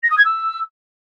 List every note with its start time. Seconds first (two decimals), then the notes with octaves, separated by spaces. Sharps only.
0.03 A#6
0.10 D#6
0.17 G#6
0.25 E6